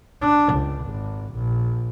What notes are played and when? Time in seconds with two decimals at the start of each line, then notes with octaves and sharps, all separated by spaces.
0.22 D4
0.54 C#2
0.85 G#1
1.33 A#1